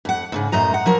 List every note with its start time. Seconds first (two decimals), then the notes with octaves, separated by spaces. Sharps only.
0.05 F2 F#5
0.32 D#2 G#2 C#3
0.52 F#2 A2 D#5 A#5
0.74 F#5
0.86 F3 F#3 A#4